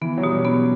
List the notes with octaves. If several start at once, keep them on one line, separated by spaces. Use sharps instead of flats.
E3 B3
F#3
B2 G3
B3 C#4